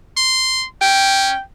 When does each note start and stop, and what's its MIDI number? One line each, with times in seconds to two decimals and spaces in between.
0.17 0.66 84
0.82 1.34 61
0.82 1.40 79